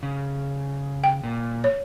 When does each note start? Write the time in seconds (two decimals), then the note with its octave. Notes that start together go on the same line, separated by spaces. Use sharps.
0.03 C#3
1.04 G5
1.23 A#2
1.64 C#5